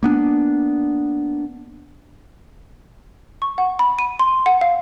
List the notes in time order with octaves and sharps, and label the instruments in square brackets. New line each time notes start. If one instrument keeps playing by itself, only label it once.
[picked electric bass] A#3 B3 D4
[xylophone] C#6
F#5
B5
D#7
C6
F#5
F5